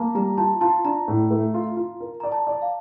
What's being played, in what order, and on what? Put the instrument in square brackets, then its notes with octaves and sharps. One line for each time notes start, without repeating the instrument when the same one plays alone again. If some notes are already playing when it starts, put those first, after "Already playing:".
Already playing: [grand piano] A#3 [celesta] A5 A#5
[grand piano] G3 [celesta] A#5
[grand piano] F4 [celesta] A5
[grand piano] F4 [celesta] A5
[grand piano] D4 [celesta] A#5
[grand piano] A2
A3
F4
F4
A#4
[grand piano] D5 [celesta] A#5
[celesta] A5
[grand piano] D5
[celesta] F5